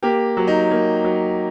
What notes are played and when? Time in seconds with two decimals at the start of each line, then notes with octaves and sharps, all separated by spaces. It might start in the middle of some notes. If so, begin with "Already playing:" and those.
0.03 A#3 G4
0.37 F#3
0.47 D#4
0.71 A#3
1.04 F#3